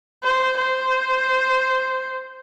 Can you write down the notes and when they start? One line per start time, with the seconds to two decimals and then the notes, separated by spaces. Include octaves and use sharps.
0.24 C5
0.58 C5